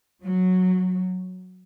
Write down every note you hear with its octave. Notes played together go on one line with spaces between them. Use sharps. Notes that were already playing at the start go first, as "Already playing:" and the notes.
F#3